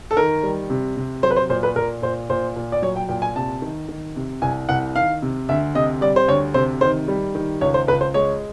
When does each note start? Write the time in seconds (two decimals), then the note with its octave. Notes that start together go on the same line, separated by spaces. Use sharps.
0.11 A4
0.17 D#3 A#4
0.43 G3
0.70 C3
0.97 C3
1.23 F#3 C5
1.31 B4
1.36 C5
1.49 A#2 C5
1.63 B4
1.76 A#2 A#4
2.02 A#2 C5
2.29 A#2 C5
2.56 A#2
2.72 D5
2.82 F#3 C#5
2.96 G5
3.09 A#2 G5
3.22 G#5
3.36 C3 A5
3.62 D#3
3.88 D#3
4.16 C3
4.42 C2 G#5
4.69 C2 F#5
4.96 D#3 F5
5.22 C3
5.49 D2 E5
5.75 C3 D#5
6.01 G3 D5
6.16 C5
6.28 D2 C#5
6.54 C3 C5
6.81 D#3 C5
7.08 G3
7.35 D#3
7.61 C#2 C#5
7.74 C5
7.87 C#2 B4
8.01 C5
8.14 G#3 C#5